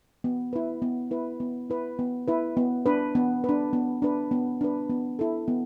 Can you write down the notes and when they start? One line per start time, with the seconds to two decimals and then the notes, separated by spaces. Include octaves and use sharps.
0.24 B3
0.53 E4 B4
0.82 B3
1.11 E4 B4
1.40 B3
1.70 E4 B4
1.99 B3
2.28 E4 B4
2.57 B3
2.86 D4 B4
3.15 B3
3.44 D4 B4
3.73 B3
4.02 D4 B4
4.31 B3
4.61 D4 B4
4.90 B3
5.19 E4 A4
5.48 B3